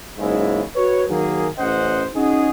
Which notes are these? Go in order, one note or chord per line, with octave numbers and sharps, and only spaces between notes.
F#1 G#2 C#3 G#3 E4
F#4 B4 C#5
D#3 F#3 A#3 G#4
A1 C#4 C5 D#5 F#5
C#4 D#4 F#4 G#4